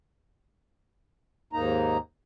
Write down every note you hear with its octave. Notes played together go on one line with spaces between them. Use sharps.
D#2 G#2 A#3 D#4 A#5